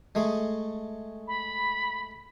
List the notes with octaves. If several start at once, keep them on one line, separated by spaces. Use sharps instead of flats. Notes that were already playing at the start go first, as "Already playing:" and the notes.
G#3 A3 G#4
B5